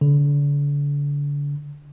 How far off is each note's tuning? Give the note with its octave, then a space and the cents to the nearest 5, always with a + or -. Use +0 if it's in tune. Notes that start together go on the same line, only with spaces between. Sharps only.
D3 -35